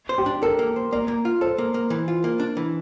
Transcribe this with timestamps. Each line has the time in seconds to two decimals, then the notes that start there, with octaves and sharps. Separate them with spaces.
0.09 C5
0.18 G4
0.26 D4
0.42 A4 A#4
0.59 A#3
0.76 C5
0.92 A#3 D5
1.08 A#3
1.25 F4
1.41 A4 C5
1.58 A#3
1.74 A#3
1.90 E3
2.08 F4
2.24 A#3
2.40 D4
2.57 E3